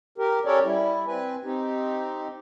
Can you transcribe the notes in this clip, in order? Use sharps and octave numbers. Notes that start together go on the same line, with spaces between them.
G4 A#4
C#4 G4 A4 A#4 C#5 D5
G3 E4
C4 B4 G#5
C4 D#4 G4